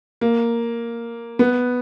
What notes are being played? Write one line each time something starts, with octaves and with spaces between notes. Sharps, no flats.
A#3
B3